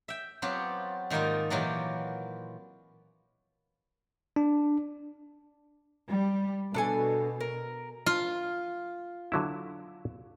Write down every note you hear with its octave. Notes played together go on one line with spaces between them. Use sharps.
E5 G5
F#3 B3 C4 F4 G4
G#2 D#3 G3 A#3 D#4 F4
A#2 E3 F#3 A#3 F4 G4
D4
G3
B2 D4 A4 G#5
A#4
F4
D3 F#3 E4